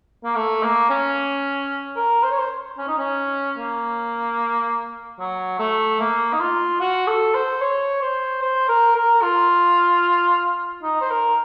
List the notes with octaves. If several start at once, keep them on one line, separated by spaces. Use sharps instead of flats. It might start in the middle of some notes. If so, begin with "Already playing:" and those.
A#3
A3
A#3
C#4
A#4
C5
C#5
C5
C#4
D#4
C#4
A#3
F#3
A3
A#3
D#4
F4
F#4
A4
C5
C#5
C5
C5
A#4
A#4
F4
D#4
C5
A#4